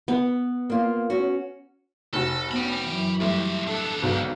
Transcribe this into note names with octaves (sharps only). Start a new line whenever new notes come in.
B3
A#3 F4
C#4 F#4
F1 F#4 A4
B3 C#4 G5 B5
F#2 E3
G3 A3 F4 G4
B3 D4 A4
B1 G#2 B2 D3